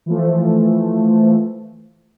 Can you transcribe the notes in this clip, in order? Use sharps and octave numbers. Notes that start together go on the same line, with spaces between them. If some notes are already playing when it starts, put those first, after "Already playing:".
E3 F3 A3